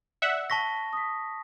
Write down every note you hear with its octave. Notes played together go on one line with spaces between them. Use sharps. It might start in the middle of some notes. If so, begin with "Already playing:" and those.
D5 E5 F#5
A5 C#6 A#6 B6
D#6 B6